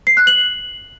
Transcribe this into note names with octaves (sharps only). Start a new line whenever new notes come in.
C7
F#6
F#7